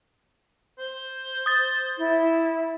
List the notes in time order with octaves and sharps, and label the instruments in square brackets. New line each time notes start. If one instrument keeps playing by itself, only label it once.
[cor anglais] C5
[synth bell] D#6 A6
[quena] E4